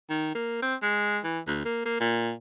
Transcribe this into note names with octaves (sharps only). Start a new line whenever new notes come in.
D#3
A#3
C4
G#3
E3
D2
A#3
A#3
A#2